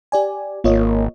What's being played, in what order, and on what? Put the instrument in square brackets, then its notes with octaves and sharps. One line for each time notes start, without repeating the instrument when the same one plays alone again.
[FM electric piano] G4 D5 G#5
[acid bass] G#1 [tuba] A#3 [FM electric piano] F4 C#5 D#5